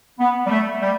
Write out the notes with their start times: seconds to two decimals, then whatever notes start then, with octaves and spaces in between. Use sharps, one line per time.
0.19 B3
0.46 G3
0.50 A3
0.81 G3